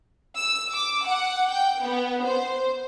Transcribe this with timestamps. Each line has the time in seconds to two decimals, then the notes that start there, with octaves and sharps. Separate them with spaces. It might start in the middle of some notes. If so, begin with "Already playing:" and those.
0.37 E6
0.73 D6
1.05 F#5
1.49 G5
1.83 B3
2.25 C5